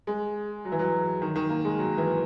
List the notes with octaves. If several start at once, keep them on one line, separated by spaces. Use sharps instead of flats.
G#3
F#3
E3
F#3
D#3
D#3
A#3
G#3
F#3
E3